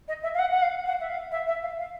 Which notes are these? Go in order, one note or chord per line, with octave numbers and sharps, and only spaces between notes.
D#5
E5
F5
F#5
F#5
F5
F#5
E5
F5
E5
E5
F5
F5